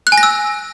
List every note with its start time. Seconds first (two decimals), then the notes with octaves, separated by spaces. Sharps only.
0.07 F#6
0.12 G#5
0.18 A#6
0.23 E6